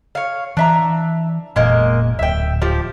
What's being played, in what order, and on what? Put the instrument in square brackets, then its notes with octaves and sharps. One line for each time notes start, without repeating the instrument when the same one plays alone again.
[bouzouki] C#5 F5
[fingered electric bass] E3 [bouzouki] D4 E5 A#5
[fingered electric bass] F1 A#2 [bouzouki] G#3 A#3 D#5
[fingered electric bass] D1 [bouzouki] E5 G5
[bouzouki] F3 G4